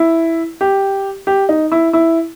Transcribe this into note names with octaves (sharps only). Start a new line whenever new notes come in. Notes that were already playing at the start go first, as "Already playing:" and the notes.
Already playing: E4
G4
G4
D#4
E4
E4